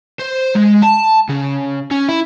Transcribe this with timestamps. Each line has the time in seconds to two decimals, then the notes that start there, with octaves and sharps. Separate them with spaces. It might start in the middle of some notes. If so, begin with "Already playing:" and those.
0.19 C5
0.56 G#3
0.83 A5
1.29 C#3
1.91 C#4
2.09 E4